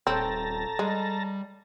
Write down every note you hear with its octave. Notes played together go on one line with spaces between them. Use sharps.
D#1 C4 A4 C#5 A5 A#5 G6
G3 G#3